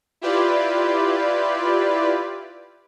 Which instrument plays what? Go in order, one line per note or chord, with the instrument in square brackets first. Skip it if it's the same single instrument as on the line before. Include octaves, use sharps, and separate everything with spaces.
[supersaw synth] E4 F4 G4 B4 D5